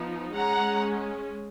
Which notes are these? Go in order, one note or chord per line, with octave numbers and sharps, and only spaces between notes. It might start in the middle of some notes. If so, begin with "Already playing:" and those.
Already playing: F3 B3 D#4
G#3 C#4 F#5 A#5